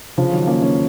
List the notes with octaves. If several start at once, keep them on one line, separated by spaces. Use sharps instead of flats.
C#3 F3
D#3 F#3
A#3 C#4
A#3 C#4